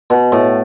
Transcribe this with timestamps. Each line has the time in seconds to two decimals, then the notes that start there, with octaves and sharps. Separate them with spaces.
0.10 B2
0.32 A2